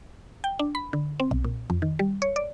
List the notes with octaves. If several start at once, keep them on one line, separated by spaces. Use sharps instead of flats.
G5
D4
B5
D3
C4
B1
A#2
F2
D#3
G3
C#5
D5